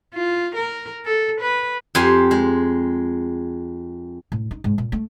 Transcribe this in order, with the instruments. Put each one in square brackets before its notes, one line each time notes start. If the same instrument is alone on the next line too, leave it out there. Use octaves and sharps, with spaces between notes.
[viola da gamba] F4
A#4
A4
B4
[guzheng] F2 G4 G#5 C6
G#3
[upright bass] A2
D#4
G#2
A#2
A3